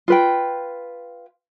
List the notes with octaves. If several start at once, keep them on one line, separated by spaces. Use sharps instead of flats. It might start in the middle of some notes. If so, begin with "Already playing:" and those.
F4 B4 G5